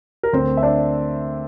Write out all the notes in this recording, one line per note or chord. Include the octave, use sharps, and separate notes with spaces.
A#4
D2 C4 C5
E5
D4 D5